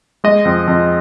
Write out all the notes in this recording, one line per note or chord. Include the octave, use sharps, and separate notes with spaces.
G#3 D#5
F2
F2